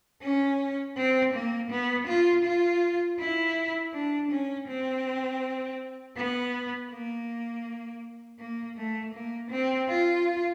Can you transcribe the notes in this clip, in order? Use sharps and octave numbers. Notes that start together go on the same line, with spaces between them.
C#4
C4
A#3
B3
F4
F4
E4
D4
C#4
C4
B3
A#3
A#3
A3
A#3
C4
F4